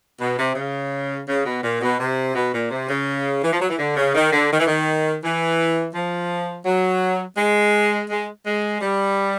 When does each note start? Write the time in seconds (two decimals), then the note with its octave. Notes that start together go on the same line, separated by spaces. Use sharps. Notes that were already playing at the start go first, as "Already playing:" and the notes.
0.20 B2
0.38 C3
0.56 C#3
1.27 C#3
1.45 B2
1.63 A#2
1.81 B2
1.99 C3
2.35 B2
2.53 A#2
2.71 C3
2.89 C#3
3.43 E3
3.52 F3
3.61 F#3
3.70 E3
3.79 D3
3.96 C#3
4.15 D#3
4.32 D3
4.51 D#3
4.59 E3
4.67 D#3
5.23 E3
5.94 F3
6.66 F#3
7.37 G#3
8.09 G#3
8.46 G#3
8.81 G3